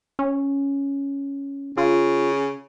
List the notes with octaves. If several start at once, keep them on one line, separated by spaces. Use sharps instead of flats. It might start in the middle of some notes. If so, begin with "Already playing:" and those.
C#4
C#3 F4